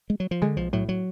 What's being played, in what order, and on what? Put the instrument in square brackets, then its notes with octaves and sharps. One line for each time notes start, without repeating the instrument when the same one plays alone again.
[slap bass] G#3
F#3
F3
[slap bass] D3 [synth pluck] G#3
[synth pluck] B1 [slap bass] F3
[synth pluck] A2 [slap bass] F#3
[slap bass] F#3